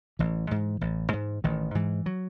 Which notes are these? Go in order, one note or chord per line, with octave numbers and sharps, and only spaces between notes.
A1 E3
G#2
A1
G#2
A1 D#3
G#2 E3
F#3